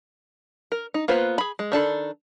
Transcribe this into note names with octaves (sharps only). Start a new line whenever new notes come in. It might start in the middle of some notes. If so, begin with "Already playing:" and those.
A#4
D#4
A#3 B3 F4 B4 C5
G#4 B5
G#3
D#3 D4 A4 B5